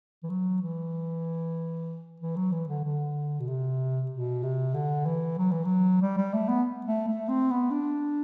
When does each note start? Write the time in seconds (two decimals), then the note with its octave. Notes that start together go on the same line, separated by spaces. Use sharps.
0.23 E3
0.30 F#3
0.62 E3
2.20 E3
2.36 F#3
2.52 E3
2.68 D3
2.84 D3
3.40 B2
3.47 C3
4.11 B2
4.43 C3
4.74 D3
5.06 E3
5.38 F#3
5.51 E3
5.64 F#3
6.02 G3
6.17 G3
6.33 A3
6.49 B3
6.86 A3
7.08 A3
7.29 C4
7.50 B3
7.70 D4